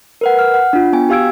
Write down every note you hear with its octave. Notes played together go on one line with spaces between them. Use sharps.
A#4 B4 F#5
F6
F#5
D4 F4
B3 G5 G#5
F#4 G4 F5 E6 G#6 D7